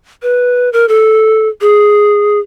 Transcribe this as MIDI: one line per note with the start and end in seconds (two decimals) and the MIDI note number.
0.23 0.71 71
0.73 0.86 70
0.89 1.49 69
1.61 2.39 68